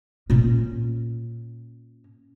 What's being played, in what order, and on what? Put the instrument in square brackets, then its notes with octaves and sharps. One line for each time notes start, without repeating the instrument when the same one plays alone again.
[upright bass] A#2 C#4